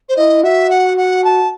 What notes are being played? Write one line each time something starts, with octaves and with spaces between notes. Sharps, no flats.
C5
E4 D#5
F#4 E5
F#5
F#5
A5